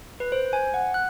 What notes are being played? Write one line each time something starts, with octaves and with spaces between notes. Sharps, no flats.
B4
C5
G#5
F#5
F#6